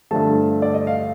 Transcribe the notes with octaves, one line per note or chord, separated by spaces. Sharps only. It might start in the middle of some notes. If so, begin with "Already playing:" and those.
G2 D3 F3 A3 A5
D5
D#5
F5